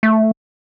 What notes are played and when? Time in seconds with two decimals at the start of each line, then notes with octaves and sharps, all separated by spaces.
0.03 A3